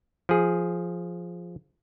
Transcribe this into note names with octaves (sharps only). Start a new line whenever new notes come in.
F3 G#4